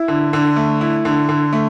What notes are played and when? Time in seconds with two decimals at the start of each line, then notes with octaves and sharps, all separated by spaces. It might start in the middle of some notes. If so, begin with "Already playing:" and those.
Already playing: E4
0.08 D3
0.33 D3
0.56 A3
0.81 E4
1.05 D3
1.29 D3
1.53 A3